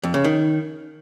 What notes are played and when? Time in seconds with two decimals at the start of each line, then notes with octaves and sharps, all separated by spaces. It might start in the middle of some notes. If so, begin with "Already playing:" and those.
0.03 F2
0.14 C#3
0.24 D#3